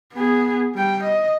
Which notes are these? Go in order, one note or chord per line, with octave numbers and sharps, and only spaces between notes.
B3 G#4
G3 G5
D#5